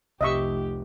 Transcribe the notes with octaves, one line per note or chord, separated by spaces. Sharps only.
F1 C2 G4 D#5 E5 C#6